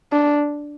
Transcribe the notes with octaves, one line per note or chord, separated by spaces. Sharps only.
D4